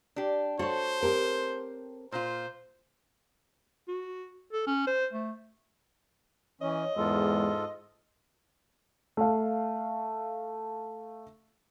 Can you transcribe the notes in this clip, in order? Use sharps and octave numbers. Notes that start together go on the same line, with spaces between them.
D4 G4
F#4 A4 C5 C#5
C4 G4 A#4
A#2 F4 C5
F#4
A4
C#4
C5
A3
E3 C#4 C#5 D#5
E2 G#2 G#3 F4 A4
A3 F5